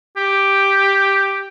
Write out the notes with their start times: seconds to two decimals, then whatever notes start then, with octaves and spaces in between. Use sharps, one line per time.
0.17 G4